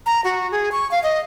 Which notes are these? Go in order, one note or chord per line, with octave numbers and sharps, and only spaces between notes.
A#5
F#4
G#4
C#6
F5
D#5